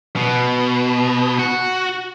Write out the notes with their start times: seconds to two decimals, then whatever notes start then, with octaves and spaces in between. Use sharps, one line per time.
0.16 B2
1.39 F#4